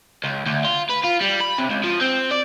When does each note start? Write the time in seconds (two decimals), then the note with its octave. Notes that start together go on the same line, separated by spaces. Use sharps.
0.24 C#2
0.46 D2
0.64 F4
0.89 B4
1.04 F4
1.21 G3
1.41 B5
1.58 C3
1.71 C#2
1.84 F3
2.01 C4
2.31 D5